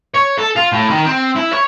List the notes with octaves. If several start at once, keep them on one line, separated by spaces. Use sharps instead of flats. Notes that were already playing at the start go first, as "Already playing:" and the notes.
C#5
A4
F4
A2
D#3
C4
E4
C#5